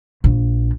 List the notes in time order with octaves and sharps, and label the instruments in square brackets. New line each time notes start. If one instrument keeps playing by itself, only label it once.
[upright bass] A#1